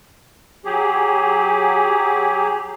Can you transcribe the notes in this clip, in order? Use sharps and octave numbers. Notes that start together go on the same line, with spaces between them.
F#3 G4 G#4